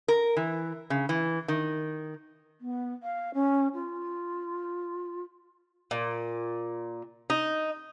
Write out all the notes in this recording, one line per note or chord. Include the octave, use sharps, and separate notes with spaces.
A#4
E3
C#3
E3
D#3
B3
F5
C#4
F4
A#2
D#4